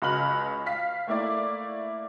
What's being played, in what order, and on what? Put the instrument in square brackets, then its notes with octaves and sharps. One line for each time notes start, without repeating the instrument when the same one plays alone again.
[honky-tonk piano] C#2 F#4 D#5 B5 F6 F#7
F5 B6
A3 A#3 E4 D5